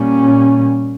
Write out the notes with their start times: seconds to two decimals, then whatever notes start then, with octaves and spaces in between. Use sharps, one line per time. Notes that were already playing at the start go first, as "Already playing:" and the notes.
Already playing: A#2 G3 C#4